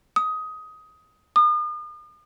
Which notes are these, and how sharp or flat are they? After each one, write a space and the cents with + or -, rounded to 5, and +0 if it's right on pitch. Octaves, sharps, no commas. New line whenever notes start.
D#6 +15
D#6 -40